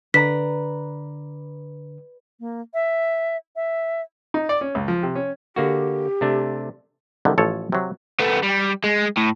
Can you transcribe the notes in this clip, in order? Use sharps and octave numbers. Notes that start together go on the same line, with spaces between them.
D3 B4 D5 A#5 B6
A#3
E5
E5
D#4
D5
C#4
C#2
F3
C3
C#4
D3 A#3 F#4 G4
C3 A3 D4
C2 D3 D#3
A1 F3 A4 C#5
C3 F#3
A3 B3
G3
G#3
A2